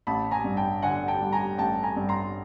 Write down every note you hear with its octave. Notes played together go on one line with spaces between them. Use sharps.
A1 A5 B5
G#5 A#5
G2
G5 A5
D3 F#5 G#5
G5 A5
G3
G#5 A#5
A1 G5 A5
G#5 A#5
G2
A#5 C6